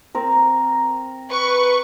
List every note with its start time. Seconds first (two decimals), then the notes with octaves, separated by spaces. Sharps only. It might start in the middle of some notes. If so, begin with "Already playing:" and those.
0.15 C4 A#4
1.29 B4 C#6